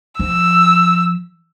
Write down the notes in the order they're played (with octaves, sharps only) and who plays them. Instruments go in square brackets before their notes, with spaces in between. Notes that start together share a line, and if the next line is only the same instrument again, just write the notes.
[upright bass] F3 [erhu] E6